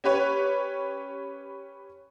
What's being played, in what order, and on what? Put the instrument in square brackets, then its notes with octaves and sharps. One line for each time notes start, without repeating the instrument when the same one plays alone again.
[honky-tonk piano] C#4 G4 B4 C#5